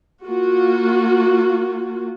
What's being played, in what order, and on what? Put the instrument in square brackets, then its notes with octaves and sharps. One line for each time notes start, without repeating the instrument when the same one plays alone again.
[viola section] A#3 F4 F#4